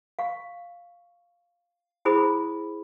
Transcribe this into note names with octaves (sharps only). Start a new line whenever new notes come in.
F5 C#6
E4 G#4 C5 B5 D#6